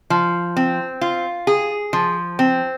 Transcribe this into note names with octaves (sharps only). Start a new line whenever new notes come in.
F3
C4
F4
G#4
F3
C4